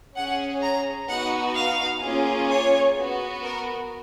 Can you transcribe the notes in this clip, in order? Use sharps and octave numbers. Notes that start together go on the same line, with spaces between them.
C#4 G#4 F#5
A#5
B3 D#4 F#4 F#5
F5
A#3 C#4 F4 G#4
C#5
B3 F#4
A#4